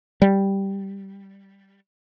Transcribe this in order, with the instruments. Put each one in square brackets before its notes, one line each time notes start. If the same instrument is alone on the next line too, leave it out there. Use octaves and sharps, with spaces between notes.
[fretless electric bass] G3